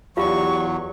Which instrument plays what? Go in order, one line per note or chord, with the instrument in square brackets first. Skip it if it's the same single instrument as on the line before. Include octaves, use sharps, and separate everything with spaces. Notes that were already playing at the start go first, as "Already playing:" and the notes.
[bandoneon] E2 F#3 [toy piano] F4 E5 F5 [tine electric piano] G4 D5 [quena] C#6